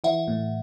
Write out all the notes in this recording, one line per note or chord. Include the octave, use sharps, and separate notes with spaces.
E3 E5 F#5
A2